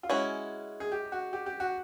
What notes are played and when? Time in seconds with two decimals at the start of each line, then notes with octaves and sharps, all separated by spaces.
0.03 F4
0.10 G#3 C#4 E4 F#4
0.80 G#4
0.92 G4
1.12 F#4
1.33 G4
1.46 G4
1.60 F#4